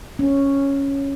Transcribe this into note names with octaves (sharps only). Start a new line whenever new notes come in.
C#4